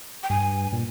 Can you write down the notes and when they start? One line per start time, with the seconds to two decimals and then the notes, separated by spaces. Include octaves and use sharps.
0.23 G5
0.30 G2 G#5
0.73 A#2